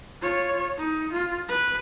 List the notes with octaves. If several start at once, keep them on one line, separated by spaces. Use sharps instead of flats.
F4 C#5
D#4
F4
B4